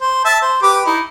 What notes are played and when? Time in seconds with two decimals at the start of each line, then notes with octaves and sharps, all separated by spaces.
0.01 C5
0.25 E5 A5
0.42 C5
0.63 G4 B4 D6
0.86 D#4 E4